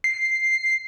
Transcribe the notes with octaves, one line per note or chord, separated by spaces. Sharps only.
C7